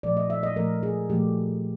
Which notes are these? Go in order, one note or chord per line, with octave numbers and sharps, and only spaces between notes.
A#2 F3 A3 D5
D#5
E5
D#5
A#2 F3 A3 A#4
G#4
A#2 F3 A3 G4